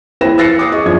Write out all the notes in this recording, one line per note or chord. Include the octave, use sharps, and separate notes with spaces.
E4 B4 C5 G5 A#6 E7
E6 F#6 A6 A#6 C7 C#7
D6 D#6 C#7
G#4 D#5 C#6
F#2 F3 D4 G#6